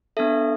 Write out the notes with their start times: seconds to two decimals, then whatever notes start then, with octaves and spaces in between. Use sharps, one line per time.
0.17 B3 D4 A4 E5